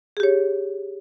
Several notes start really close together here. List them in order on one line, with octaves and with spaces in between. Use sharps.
G#4 G4 C#5